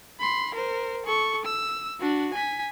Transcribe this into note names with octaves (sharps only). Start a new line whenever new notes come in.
B5 C6
A#4 C5
A4 C#6
E6
D4 F#4
G#5 B6